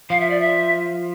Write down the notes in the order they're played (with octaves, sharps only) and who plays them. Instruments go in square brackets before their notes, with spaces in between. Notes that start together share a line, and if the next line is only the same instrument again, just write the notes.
[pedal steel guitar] F3 [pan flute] F5
[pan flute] E5
D5
E5